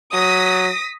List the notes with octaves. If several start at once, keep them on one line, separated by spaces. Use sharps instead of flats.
F#3 D#6 A#6 B6